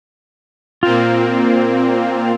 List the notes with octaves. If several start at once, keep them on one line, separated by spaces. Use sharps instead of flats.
A#2 A#3 C4 F4